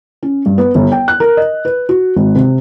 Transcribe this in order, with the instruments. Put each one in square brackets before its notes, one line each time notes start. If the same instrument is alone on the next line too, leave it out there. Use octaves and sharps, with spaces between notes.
[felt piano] C#4
G2
B3
G1
G5
F#6
A#4
D#5
B4
F#4
G#1
C3